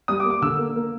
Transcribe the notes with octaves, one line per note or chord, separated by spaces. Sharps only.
G3 D#6
D6
A#3
D6
D3 E6
A#3
A#3